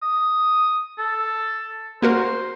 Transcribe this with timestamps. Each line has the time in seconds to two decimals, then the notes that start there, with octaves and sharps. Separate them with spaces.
0.02 D#6
0.98 A4
2.02 A#3 F#4 A#4 C5